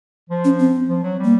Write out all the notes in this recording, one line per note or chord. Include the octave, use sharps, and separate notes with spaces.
F3
C#4
C4
F3
F#3
G3
A#3